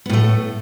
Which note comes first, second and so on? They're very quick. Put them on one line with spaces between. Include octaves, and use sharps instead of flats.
B3 A2 A3